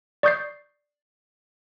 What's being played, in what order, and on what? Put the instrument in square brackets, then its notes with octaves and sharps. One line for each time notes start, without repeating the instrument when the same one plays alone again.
[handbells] D5 C#6 D#6 G6 A6 C7